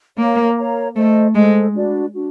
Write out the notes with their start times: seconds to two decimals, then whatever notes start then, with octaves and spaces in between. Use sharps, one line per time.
0.18 A#3 A#4 C#5 F5 A#5
0.57 A#4 C#5 F5 A#5
0.96 A3 A4 C5 D#5
1.35 G#3 A4 C5 D#5
1.75 D4 F#4 B4 D5
2.13 D4 F#4